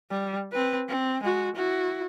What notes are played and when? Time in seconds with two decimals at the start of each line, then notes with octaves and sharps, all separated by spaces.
0.10 G3
0.52 C4 B4
0.88 C4
1.23 G#3 F#4
1.56 E4 F#4